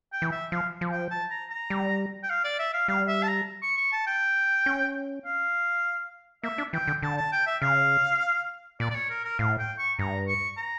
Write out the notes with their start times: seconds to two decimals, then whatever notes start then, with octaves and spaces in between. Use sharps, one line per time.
0.12 G5
0.22 E3
0.32 E5
0.52 F3 F5
0.81 F3
0.91 G5
1.11 A5
1.31 A#5
1.50 A#5
1.70 G3
2.23 G5
2.29 F5
2.44 D5
2.59 E5
2.73 F5
2.88 G3 F5
3.08 E5
3.23 A5
3.28 A#5
3.62 C#6
3.77 C#6
3.92 A5
4.07 G5
4.66 C#4
5.25 F5
6.43 A#3 E5
6.58 D4
6.73 E3 G5
6.88 D3
7.02 D3 A5
7.17 A5
7.32 G5
7.47 E5
7.62 C#3 F5
8.80 A#2 D5
8.90 D5
8.95 C#5
9.10 A#4
9.24 A#4
9.39 A2 F5
9.59 G5
9.78 C#6
9.98 G2 A#5
10.28 C#6
10.58 A#5